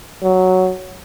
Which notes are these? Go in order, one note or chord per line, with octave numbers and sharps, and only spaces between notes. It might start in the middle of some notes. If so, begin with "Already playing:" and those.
F#3